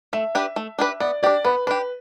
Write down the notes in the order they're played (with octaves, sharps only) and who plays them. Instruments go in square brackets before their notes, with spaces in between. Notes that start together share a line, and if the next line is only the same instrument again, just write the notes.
[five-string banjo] A3 [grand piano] E5
[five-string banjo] D4 G4 B4
A3
D4 G4 B4
[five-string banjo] B3 [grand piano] D5
[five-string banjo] D4 G4 [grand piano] D5
[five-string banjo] B3 [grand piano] B4
[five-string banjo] D4 G4 [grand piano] B4